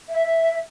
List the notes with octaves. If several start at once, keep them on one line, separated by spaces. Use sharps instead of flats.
E5